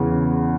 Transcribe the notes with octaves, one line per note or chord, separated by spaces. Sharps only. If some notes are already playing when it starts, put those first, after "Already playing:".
Already playing: E2 C#3 E3